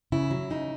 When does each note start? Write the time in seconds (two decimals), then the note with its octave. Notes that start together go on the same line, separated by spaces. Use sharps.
0.12 C#3 E4
0.31 F#3
0.50 C#3 D#4